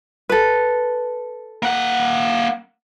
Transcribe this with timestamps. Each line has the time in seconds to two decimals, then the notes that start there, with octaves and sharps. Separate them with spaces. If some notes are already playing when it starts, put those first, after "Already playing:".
0.29 A4 B4
1.63 A#3 F#5